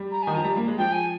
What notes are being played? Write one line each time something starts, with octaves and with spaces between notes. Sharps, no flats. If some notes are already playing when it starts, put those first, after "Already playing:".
Already playing: G3
A#5
D#3 G#5
F3 A#5
G3
A#3
G#3
F3 G5
G#5